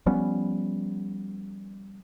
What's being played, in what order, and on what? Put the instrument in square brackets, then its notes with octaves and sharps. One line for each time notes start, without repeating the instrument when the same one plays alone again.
[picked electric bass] F3 G3 B3 C#4